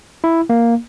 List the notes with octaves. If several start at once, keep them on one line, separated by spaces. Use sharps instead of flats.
E4
A#3